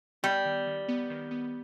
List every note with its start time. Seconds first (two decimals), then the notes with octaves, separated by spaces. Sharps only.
0.23 G3 B3
0.45 D#3
0.67 D#3
0.89 B3
1.10 D#3
1.31 B3